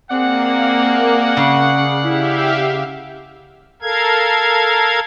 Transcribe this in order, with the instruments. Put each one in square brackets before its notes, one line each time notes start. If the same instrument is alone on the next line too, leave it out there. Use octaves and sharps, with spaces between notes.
[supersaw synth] A#3 [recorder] C4 [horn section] G#4 D5 F#5
[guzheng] C#3
[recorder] E4 [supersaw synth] G4 E5 F5
[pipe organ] A4 A#4 F5 G#6